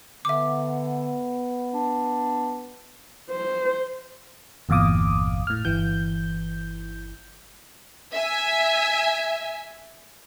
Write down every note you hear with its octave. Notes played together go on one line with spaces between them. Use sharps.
D3 B3 E5 D6
D4
C5
G1 E2 A#2 F5 D6 D#6
A2 F6
G1 E3 G6
E5 G#5